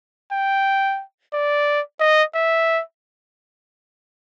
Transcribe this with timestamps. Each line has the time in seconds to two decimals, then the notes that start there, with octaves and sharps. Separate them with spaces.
0.33 G5
1.34 D5
2.00 D#5
2.35 E5